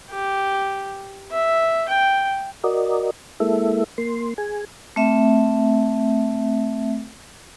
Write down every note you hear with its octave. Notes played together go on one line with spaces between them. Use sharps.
G4
E5
G5
F#4 A#4 D5 D#5
G#3 A#3 E4 A4 E5
A#3 C6
G#4 G#5
A3 C4 E5